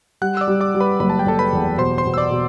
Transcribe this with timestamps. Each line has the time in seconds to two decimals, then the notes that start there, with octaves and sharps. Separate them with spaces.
0.22 G3 F#5 F#6
0.37 E6
0.41 D5 D6
0.48 G3
0.61 D5 D6
0.75 G3
0.80 B4 B5
1.00 F#1 B5
1.10 A5
1.19 G5
1.26 F#1 A4 A5
1.39 B4 B5
1.53 E2
1.78 B2 C5 C6
1.98 C5 C6
2.05 B2
2.14 E6
2.18 D5 D6
2.31 B2